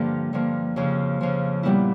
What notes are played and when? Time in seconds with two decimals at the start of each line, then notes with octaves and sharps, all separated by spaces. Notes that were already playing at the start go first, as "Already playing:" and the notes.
Already playing: G2 D3 F3 A#3
0.33 G2 D3 F3 A#3
0.76 F2 C#3 F3
1.21 F2 C#3 F3
1.63 A#2 G3 B3 E4